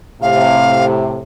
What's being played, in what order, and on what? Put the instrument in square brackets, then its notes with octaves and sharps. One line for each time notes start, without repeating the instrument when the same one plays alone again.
[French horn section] A2 C3 [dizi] F5